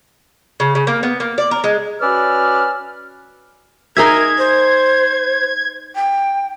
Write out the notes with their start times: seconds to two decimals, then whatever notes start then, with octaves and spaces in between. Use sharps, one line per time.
0.60 C#3
0.75 C#3
0.87 A#3
1.03 B3
1.20 A#3
1.38 D5
1.51 A#4
1.64 G#3
2.01 C#4 F#4 B4 D5 E6 F6
3.97 D#4 G#4 A#4 E5 G#6
4.38 C5
5.95 G5